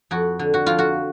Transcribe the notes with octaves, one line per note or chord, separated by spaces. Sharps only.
F2 F#4
D3
F#4
F2 F4
F#4